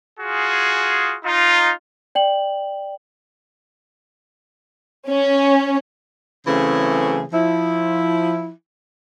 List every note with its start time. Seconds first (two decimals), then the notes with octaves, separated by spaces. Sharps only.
0.19 F4 F#4 G#4
1.24 D#4 F4
2.15 D5 G5 F#7
5.10 C#4
6.47 C#3 E3 F#3 A3 C4 G#4
7.32 F3 E4